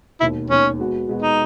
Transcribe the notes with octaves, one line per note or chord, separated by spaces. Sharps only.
E1 D#2 D#3 E4
E1 D#2 D#3 C#4
B2 G#3 B3 F#4
B2 G#3 B3 F#4
D#4